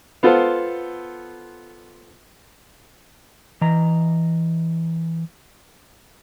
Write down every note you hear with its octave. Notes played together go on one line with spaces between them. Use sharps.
B3 F4 A4 C5
E3 D#5 A#5